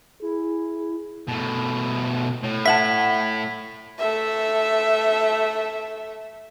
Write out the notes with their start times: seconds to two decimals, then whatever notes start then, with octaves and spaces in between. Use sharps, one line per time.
0.22 E4 G#4
1.28 B2 A3
2.43 A2
2.66 E5 F#5 A5 G#6 B6
3.99 A3 E5